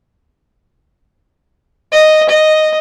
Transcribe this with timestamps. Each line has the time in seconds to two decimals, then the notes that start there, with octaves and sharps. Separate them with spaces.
1.92 D#5
2.29 D#5